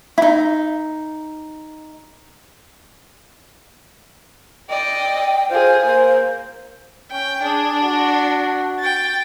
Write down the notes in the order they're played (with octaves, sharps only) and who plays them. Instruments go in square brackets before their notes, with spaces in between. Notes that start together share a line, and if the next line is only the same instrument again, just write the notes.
[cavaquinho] D#4 E4
[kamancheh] D5 D#5 [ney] G5
[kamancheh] F4 G#4 [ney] C5
[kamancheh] A#3 [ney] C5
[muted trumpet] C#4 [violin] G5
[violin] D4 [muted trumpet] G#4
[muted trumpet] F#4
[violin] G5 A6